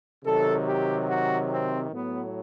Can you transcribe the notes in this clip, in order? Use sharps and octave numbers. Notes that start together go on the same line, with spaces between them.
C3 D#3 F#3 A4
G4
F#4
C4
A2 F#3 B3